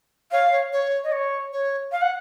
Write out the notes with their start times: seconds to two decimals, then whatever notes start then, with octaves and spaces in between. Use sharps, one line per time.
0.32 C#5 F5
0.52 C#5
0.73 C#5
1.04 D#5
1.12 C#5
1.53 C#5
1.92 F5
2.02 F#5